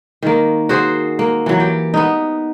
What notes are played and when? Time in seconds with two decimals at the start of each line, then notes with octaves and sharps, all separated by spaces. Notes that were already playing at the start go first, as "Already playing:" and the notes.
0.22 D#3 A#3
0.69 F#4 G#4 C5
1.19 A#3
1.46 E3 F#3
1.60 G4
1.94 B3 D#4